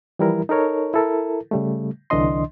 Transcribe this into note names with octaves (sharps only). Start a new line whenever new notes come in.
E3 F3 G3 E4 A#4
D#4 A4 A#4 C#5
E4 A4 A#4
C#3 G3 A3
C2 D3 E3 D4 D#5 C6